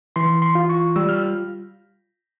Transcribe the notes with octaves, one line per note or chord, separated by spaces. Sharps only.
E3 C6
C6
F4
C#6
G3 E6
F6